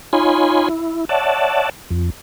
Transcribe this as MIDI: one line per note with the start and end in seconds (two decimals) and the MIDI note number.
0.13 0.69 63
0.13 0.69 65
0.13 0.69 73
0.13 0.69 80
0.13 0.69 83
0.13 0.69 84
0.69 1.05 64
1.09 1.69 73
1.09 1.69 74
1.09 1.69 76
1.09 1.69 78
1.09 1.69 81
1.91 2.10 41